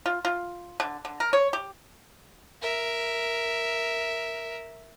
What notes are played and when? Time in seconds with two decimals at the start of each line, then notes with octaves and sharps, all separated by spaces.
0.06 F4
0.25 F4
0.80 D3
1.05 D3
1.20 A#4
1.33 C#5
1.53 G4
2.61 A#4 E5